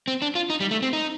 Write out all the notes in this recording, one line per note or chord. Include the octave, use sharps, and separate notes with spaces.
C4
D4
F4
D#4
G3
A3
C4
D#4